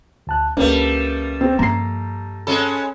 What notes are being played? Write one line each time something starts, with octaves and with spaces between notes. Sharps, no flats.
D2 A5 F#6
C#2 G3 A3 A#3 C#4 D4 B4
C4
G2 F3 A#3 A#5 C7
G#3 C#4 A4 B5